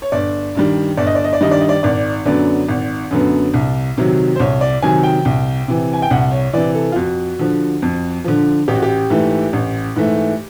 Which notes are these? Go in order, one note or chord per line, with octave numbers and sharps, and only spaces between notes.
C#5
G1 D5
G2 D#3 G3
G1 D5
D#5
D5
D#5
D5
G2 D#3 G3 D#5
D5
D#5
D5
G#1 D5
F#2 D3 F#3 B3 D5
G#1
F#2 D3 F#3 B3
C2
C3 D#3 F#3
C5
C2 C#5
D5
C3 D#3 F#3 G#5
G5
C2
C3 E3
G#5
G5
C2 F#5
C#5
C3 E3 D5
A4
F4
F2 F#4
D3 F3
F2
D3 F3
A1 G4
F#4
G4
G#2 E3 A3
A1
G#2 E3 A3